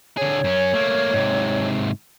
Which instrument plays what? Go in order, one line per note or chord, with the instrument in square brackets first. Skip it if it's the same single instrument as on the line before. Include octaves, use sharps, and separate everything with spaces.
[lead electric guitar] D3 G#4 [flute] C#5
[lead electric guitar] F#2 C#4
A3 A#3
G#2 C3